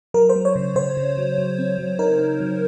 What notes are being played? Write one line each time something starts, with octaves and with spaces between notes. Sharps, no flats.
F#3 A#4
C5
F#3
C#5
C#3
C#3 C5
C#3
F#3
F#3
C4
F#3
D#4 A#4
D#4
F#3